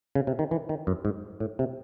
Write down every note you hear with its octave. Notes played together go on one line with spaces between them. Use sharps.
C#3
C3
D#3
E3
D#3
F#2
G#2
A2
C3